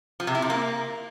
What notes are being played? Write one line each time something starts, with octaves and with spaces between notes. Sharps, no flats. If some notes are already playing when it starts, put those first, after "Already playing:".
F3
C3
E4
C3
A#3